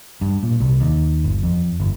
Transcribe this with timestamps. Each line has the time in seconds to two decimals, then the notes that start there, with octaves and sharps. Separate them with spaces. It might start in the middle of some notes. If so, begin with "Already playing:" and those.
0.21 G2
0.43 A#2
0.60 C2
0.80 D#2
1.24 G1
1.43 F2
1.80 G1